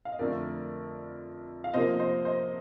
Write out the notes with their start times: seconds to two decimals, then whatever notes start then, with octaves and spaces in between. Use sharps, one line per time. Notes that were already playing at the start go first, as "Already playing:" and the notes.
0.05 F5
0.12 D#5
0.19 F2 D3 A3 A#4 D5
1.64 F5
1.74 C3 F3 A#3 C5 D#5
1.99 C5 D#5
2.25 C5 D#5